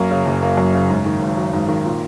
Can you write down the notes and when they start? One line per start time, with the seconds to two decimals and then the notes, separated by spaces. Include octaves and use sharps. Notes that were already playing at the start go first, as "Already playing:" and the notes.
Already playing: F#2 A#3
0.11 C#3
0.25 F#1
0.42 A#3
0.57 F#2
0.74 C#3
0.90 G#2
1.06 D#3
1.22 G#1
1.37 F#3
1.53 G#2
1.68 D#3
1.84 A#2